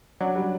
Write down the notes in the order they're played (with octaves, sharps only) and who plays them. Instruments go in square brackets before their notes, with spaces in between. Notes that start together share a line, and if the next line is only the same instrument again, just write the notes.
[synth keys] F#3 [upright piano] D4
[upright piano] G3